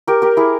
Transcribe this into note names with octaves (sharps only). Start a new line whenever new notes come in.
G4 A#4
G4 A#4
E4 G#4